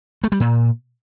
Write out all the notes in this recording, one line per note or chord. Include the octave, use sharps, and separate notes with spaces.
A3
G3
A#2